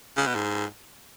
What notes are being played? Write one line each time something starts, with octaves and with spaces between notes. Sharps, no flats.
C#3
B2
G#2